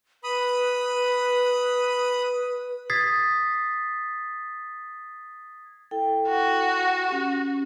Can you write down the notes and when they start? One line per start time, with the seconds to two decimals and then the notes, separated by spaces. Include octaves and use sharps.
0.24 B4 B5 D#6
2.90 D#6 G#6 A6 B6 C7
5.91 E4 A4 G5
6.28 F#4
7.08 C#4 G4